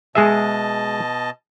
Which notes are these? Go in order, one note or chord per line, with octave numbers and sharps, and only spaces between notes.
B2 G#3 G#4 D#5 E5 A5